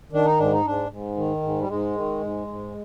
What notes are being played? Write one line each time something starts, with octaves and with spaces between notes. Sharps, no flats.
D#3 D4
D#4
G#2 D4
D#4
G#2 D4
G#2
D#3
G#2
G3
G#2 G#3
D#3
G#2
G#2